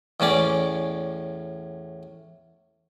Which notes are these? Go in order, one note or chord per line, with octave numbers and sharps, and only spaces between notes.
E2 A2 C#4 D5